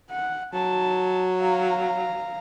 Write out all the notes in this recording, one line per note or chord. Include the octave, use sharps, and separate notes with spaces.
F#5
F#3 A5
F5 A#5